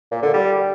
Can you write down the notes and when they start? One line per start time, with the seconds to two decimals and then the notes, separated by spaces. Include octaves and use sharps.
0.12 A#2
0.23 D3
0.34 G3